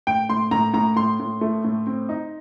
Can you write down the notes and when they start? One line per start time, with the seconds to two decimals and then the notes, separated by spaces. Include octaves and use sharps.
0.07 A2 G5
0.29 A2 C6
0.51 A2 A#5
0.74 A2 A#5
0.96 A2 C6
1.20 A2
1.41 A3
1.65 A2
1.87 C4
2.09 D#4